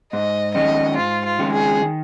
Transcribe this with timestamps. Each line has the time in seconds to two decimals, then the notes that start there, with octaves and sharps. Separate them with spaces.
0.13 G#2 D#5
0.54 D#3 G#3 C#4 D#5
0.97 G#2 F4
1.25 F4
1.39 D#3 G#3 C#4
1.52 G#4
1.82 D#3